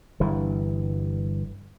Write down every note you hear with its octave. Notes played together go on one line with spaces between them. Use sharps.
G1 G2 E3